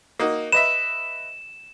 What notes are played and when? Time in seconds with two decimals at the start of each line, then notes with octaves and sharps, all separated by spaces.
0.19 A#3 D#4 F#4
0.52 B4 D#5 E5 E7